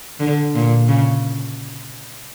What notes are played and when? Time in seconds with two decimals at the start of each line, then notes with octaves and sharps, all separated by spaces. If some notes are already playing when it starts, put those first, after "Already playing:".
0.20 D3
0.55 A#2
0.88 C#3